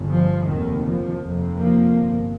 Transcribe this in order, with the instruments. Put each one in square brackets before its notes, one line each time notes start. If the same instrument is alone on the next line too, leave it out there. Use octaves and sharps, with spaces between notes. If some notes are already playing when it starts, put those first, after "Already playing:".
Already playing: [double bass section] G1 G2
F3
F1 D#2 D#3
F3
F1 F2 C3
F3 A#3
G1 G2